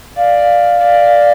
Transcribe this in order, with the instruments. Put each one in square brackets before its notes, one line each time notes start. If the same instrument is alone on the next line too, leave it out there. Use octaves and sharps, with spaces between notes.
[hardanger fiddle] D5 [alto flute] F5
[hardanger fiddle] D5